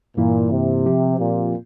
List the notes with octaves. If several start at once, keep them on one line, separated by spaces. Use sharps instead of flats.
G2 A#2 E3 A#3 E4
C3
F3 C4 G4
A#2